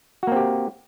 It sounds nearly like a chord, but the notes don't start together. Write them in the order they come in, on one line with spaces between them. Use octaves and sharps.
F#4 A#3 C4 G4